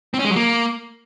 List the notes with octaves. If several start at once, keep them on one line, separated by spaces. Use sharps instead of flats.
C4
C#4
G#3
F#3
A#3